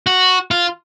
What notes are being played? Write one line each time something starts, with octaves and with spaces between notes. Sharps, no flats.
F#4
F4